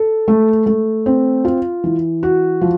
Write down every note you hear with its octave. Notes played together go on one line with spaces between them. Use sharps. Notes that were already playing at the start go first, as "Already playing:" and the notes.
Already playing: A4
A3
A3
C4
F4
E3
F#4
F3